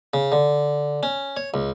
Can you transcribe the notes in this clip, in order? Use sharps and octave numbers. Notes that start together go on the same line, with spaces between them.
C#3
D3
C#4
C#5
C#2